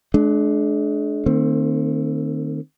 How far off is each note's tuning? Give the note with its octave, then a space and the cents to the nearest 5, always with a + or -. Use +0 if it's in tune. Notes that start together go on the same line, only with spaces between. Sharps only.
G#3 +40 D4 +0
D#3 -20 A3 +45 C4 +5